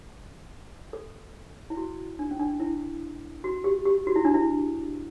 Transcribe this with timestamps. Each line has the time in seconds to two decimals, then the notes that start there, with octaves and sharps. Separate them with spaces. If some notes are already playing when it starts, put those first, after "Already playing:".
0.93 A4
1.70 E4
1.77 F#4
2.19 D4
2.31 C#4
2.39 D4
2.60 E4
3.44 F#4
3.64 G4
3.85 G4
4.07 F#4
4.16 E4
4.25 D4
4.34 E4